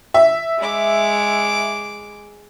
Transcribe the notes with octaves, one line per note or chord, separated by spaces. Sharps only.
E5
G#3 D6